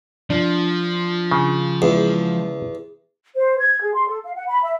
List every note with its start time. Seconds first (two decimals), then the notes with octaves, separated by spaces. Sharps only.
0.30 F3 D4
1.31 C#3
1.82 E2 G#3
3.35 C5
3.59 G#6
3.82 G#4
3.94 C6
4.07 A4
4.24 F5
4.36 F#5
4.48 B5
4.63 E5